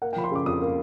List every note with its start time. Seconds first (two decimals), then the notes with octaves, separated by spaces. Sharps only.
0.02 A#3 F#5
0.13 G5
0.16 F3 B5
0.24 C6
0.31 C#3 D6
0.46 F2 D#6
0.61 A#3